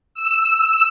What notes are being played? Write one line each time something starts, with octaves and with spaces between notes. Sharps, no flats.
E6